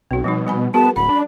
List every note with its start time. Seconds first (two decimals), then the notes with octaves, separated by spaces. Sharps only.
0.11 B1 C4 F#4
0.24 B2 F3 G3 D#4
0.47 G3 G#5 B5
0.74 B3 F#4 G#4 A#4 A5
0.96 D1 F#5 B5
1.09 D4